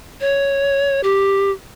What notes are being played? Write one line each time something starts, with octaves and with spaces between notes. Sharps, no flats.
C#5
G4